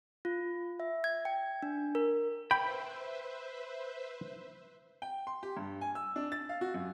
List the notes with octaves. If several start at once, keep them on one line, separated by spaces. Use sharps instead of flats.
F4
E5
G#6
G5
D4
A#4
B4 C5 E5 G5 B5
G5
C6
G4
G2
G#5
E6
D4
A6
F5
F#4
F#2